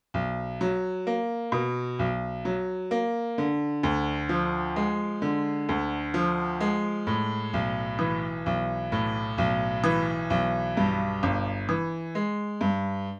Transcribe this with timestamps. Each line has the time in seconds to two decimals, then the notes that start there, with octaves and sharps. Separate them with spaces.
0.14 B1
0.61 F#3
1.07 A#3
1.52 B2
1.99 B1
2.45 F#3
2.91 A#3
3.38 D3
3.83 D2
4.29 F3
4.76 G#3
5.22 D3
5.69 D2
6.14 F3
6.60 G#3
7.07 A2
7.53 B1
7.99 E3
8.46 B1
8.92 A2
9.38 B1
9.84 E3
10.30 B1
10.77 G2
11.23 G1
11.69 E3
12.15 G#3
12.61 G2